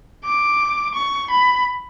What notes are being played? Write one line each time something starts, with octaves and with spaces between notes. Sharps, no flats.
D6
C#6
B5